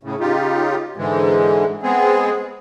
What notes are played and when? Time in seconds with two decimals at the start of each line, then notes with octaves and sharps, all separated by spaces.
0.03 A2 C#3
0.20 C#3 D#4 F4 G4
0.97 G#2 D3 E3 G#3
1.83 G#3 B3 C4 G#4